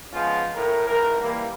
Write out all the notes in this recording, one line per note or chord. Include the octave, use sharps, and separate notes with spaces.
F3 G#3 B3 C#4 F4
A2 A#4
G#1 E3 A#4
E3 G3 A#3